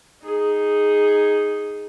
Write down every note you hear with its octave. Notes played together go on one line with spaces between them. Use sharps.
D#4 G#4